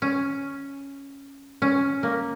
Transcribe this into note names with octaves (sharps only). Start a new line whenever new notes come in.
C#4
C#4
A#3